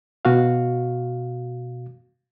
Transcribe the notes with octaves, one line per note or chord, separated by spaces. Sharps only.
B2 F#4 F5